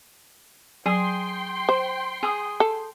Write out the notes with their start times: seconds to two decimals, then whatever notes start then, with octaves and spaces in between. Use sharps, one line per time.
0.86 F#3 G#4 G5 C6
1.69 C5
2.23 G#4 D#6
2.60 A4